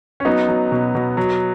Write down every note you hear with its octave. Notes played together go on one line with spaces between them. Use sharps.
C#4
F#3 B3 D#4
F#3
B2
B2
F#3